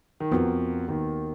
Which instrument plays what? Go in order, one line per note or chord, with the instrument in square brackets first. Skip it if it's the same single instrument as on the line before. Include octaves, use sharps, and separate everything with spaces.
[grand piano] D#3
[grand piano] F2 F3 [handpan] B3 F#4 A#4
[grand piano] D#2 D#3